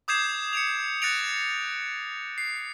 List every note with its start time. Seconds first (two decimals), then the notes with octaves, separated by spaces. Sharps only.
0.08 D6 D#6 G6 G#6 C7 E7
0.53 C#7 D7 F7
1.02 F#6 A6 A#6 C#7 D7 F7
2.38 C7